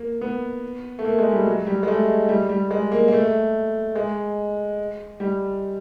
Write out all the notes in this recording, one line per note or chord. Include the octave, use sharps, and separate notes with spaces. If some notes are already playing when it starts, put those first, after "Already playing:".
Already playing: A#3
B3
A3
A#3
G#3
G3
F#3
G3
G#3
A3
G3
G3
G#3
A#3
A#3
A3
G#3
G3